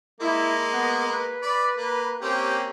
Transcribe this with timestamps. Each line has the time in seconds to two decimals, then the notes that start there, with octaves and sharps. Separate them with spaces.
0.21 G#3 A#3 E4
0.72 B3
1.06 B4
1.43 D5 B5
1.77 A#3
2.21 A#3 C4 C#4 G4